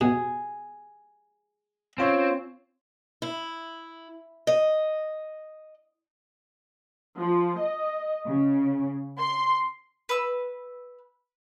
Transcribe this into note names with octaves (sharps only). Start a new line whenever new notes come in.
B2 G#4
C4 C#4 F4 C#5
E4
D#5
F3
D#5
C#3
C6
B4 E6